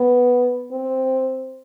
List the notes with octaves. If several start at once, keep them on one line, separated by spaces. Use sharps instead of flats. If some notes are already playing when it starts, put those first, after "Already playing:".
Already playing: B3
C4